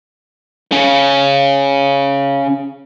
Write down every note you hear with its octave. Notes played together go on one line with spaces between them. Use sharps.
C#3 C#4